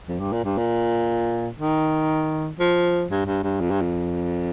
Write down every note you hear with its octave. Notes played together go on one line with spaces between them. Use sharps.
F2
G2
A#2
G2
A#2
D#3
F3
G2
G2
G2
F2
G2
F2